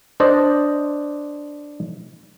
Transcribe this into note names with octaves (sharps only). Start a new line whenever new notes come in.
D4 C5 D5 D#5